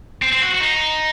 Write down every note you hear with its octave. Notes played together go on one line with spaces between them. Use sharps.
C4
C4
F#4
F#4
D#4